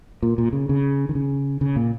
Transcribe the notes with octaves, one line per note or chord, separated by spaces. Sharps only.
A#2
A#2
C#3
C#3
D#3
C#3
C#3
A#2